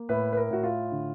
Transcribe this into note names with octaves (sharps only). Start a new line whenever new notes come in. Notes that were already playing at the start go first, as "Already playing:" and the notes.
Already playing: A#3
A2 B4
B4
A#4
A2 F#4
F4
D3